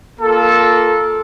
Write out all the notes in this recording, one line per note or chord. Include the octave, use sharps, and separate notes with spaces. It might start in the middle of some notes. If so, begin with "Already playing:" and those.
A#3 F4 A4